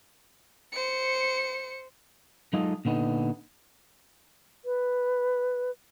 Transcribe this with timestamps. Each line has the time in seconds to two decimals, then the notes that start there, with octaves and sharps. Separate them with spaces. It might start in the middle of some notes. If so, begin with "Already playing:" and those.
0.72 C5 C#7
2.53 F#3 G#3 D#4 F4 A4 D#5
2.85 A#2 D3 B3 D#4
4.65 B4